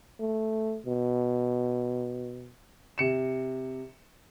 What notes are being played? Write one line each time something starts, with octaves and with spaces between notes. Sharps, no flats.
A3
B2
C3 C#7 E7